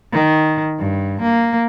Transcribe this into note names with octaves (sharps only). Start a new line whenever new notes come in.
D#3
G2
A#3